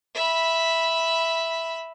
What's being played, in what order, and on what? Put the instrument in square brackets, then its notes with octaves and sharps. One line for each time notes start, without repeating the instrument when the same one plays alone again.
[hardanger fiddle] E5 B5